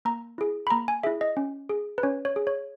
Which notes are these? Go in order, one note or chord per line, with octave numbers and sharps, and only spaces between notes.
A#3 A#5
E4 G#4
B5
A#3 A#5
G#5
E4 G#4 E5
D#5
C#4
G#4
B4
C#4 C#5
C#5
G#4
C#5